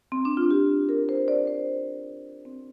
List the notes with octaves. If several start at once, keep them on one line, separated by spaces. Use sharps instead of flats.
C4
D4
F4
G4
A#4
C5
D5
C5
C4